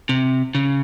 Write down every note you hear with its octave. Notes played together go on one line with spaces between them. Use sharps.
C3
C#3